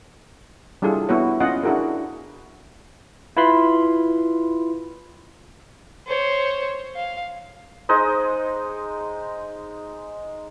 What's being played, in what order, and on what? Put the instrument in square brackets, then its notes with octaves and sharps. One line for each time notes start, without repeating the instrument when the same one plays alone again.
[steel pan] G3 D4 E4 F4 G#4 A4
B3 E4 F#4 C#5
B3 C#4 F4 D#5 F#5
D4 E4 F#4 G#4 A#4
[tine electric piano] E4 F4 B4 B5 C6
[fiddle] C5 C#5
F5
[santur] G#3 D#4 C5 D#5